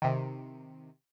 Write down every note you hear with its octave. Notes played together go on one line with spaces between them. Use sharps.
C3 D#3